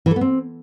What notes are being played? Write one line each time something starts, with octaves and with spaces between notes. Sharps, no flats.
E3
A4
B3
C4